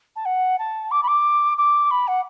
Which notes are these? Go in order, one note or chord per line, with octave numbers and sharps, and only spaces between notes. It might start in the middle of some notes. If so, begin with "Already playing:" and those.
A5
F#5
A5
D6
B5
D6
D6
B5
F#5